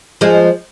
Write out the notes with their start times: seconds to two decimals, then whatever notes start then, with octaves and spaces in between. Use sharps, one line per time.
0.21 F3 G#3